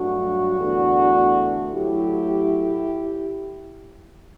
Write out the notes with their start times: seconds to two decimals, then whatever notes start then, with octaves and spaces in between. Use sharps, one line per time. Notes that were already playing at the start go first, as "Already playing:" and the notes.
Already playing: G2 F#3 A3 D4 F#4
0.57 E2 D3 A3
1.74 A2 F#3 A3 E4 G4